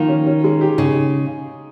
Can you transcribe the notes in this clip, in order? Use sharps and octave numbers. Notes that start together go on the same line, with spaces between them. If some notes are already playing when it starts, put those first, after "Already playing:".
Already playing: D#3 F3 A#3
C#4
C#4
G#3
G4
C#3 D#4